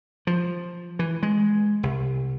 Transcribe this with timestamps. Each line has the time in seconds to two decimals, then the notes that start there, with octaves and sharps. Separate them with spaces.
0.27 F3
0.99 E3
1.23 G#3
1.83 C2